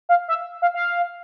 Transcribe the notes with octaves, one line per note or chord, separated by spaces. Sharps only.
F5
E5
F5
F5